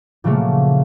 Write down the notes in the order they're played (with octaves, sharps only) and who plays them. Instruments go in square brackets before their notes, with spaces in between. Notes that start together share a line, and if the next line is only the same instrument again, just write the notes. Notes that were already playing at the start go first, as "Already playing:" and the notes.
[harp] A#2 C#3 F3 F#3 A3 A#3